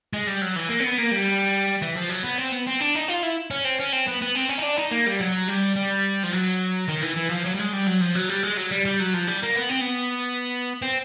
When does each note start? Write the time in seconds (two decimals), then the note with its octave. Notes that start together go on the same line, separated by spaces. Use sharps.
0.13 G#3
0.27 G3
0.41 F#3
0.56 E3
0.69 A#3
0.80 C4
0.84 B3
0.98 A#3
1.11 G3
1.82 E3
1.97 F3
2.10 F#3
2.24 B3
2.38 C4
2.52 B3
2.67 C4
2.81 D4
2.95 D#4
3.08 F4
3.23 E4
3.51 C#4
3.65 C4
3.79 C#4
3.92 C4
4.07 B3
4.22 B3
4.35 C4
4.49 C#4
4.59 D#4
4.63 D4
4.78 D#4
4.91 A#3
5.06 G3
5.20 F#3
5.48 G3
5.76 G3
6.23 F3
6.32 F#3
6.89 D#3
7.03 E3
7.17 E3
7.31 F3
7.45 F#3
7.55 G3
7.60 G#3
7.73 G3
7.87 F#3
8.01 F3
8.15 F#3
8.29 G3
8.43 G#3
8.57 F#3
8.71 G3
8.85 G3
9.00 F#3
9.14 F3
9.27 G3
9.42 A#3
9.55 B3
9.69 C4
9.81 B3
10.82 C4